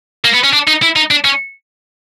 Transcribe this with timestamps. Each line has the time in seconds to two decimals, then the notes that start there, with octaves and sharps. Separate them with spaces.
0.24 A#3
0.34 B3
0.43 C#4
0.53 D4
0.67 D#4
0.82 E4
0.96 D#4
1.11 D4
1.25 C#4